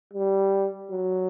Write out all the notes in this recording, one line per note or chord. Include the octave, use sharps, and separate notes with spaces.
G3
F#3